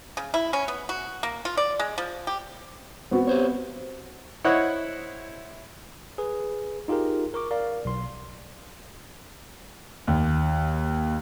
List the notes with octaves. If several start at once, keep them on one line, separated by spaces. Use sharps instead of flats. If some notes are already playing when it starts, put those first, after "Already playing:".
C#3
E4
C#4
B3
F#4
A#3
F4
D5
G#3
F3
G4
B3 C4 F#4
G4 C5 C#5
E4 C5 C#5 D#5 F#5
G#4 B4
D#4 F4 G4 G#4 A#4
A#4 C#6 D6
A#4 D5 F5
B1 C6
D#2